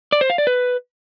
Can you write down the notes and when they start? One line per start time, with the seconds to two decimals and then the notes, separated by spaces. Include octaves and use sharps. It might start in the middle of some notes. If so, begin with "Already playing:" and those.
0.12 D5
0.21 C5
0.30 F5
0.38 D5
0.47 B4